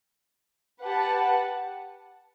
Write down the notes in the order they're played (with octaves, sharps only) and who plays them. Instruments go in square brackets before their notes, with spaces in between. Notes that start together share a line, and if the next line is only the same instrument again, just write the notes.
[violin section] G4 B4 F#5 A5